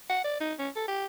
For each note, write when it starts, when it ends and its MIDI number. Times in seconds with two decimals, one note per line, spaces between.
0.09 0.22 78
0.24 0.38 74
0.40 0.54 63
0.59 0.69 61
0.75 0.87 69
0.88 1.06 67